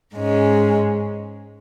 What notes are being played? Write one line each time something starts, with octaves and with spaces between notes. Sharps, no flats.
G#2 G#3 C#4